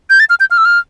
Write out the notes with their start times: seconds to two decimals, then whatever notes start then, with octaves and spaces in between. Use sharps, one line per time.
0.10 G6
0.20 A6
0.30 F6
0.40 G6
0.51 F6
0.58 E6
0.65 F6